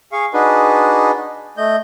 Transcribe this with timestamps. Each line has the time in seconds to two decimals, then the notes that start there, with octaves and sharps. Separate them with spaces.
0.12 G#4 F5 C#6
0.34 D4 D#4 F#4 G#4 B4
1.57 A3 D#5 G6